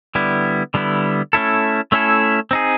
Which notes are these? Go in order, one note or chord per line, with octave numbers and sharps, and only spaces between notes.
D3 G3 B3 E4
D3 G3 B3 E4
A3 C#4 E4 A4
A3 C#4 E4 A4
C4 D#4 G#4